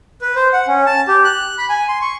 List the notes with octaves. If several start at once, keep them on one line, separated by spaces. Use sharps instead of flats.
B4
C5
F#5
C#4
A5
G4
F#6
B5
G#5
C6
C#6